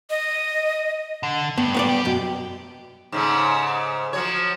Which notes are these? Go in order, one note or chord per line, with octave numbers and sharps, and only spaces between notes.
D#5
D3
G2 B3
B3 B4 D5
G4
F#2 B2
G#2 C#3 A3
F3 F#3 C#5